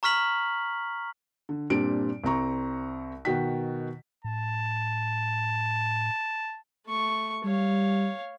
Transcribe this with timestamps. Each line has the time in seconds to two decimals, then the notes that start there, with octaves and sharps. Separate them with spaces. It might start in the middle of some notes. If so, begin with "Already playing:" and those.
0.03 A#5 C#6 F6 B6 F#7
1.49 D3
1.70 G2 A#2 G3 C4 D4 D7
2.24 C2 C4 A#5 C#6
3.25 B2 D#3 F#4 G5 B6
4.25 A2 A5
6.87 A3 C#6
7.45 G3 C#5 F5